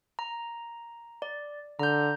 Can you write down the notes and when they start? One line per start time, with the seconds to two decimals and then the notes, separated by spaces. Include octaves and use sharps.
0.19 A#5
1.22 D5
1.79 D3 A#5 G6